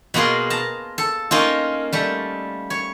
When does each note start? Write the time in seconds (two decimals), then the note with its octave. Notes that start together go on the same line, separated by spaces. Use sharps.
0.14 B2 A#3 F4 G#4
0.50 A5 A#5
0.98 A4
1.31 A#3 C#4 D#4 F4
1.93 G3 A3
2.70 C#5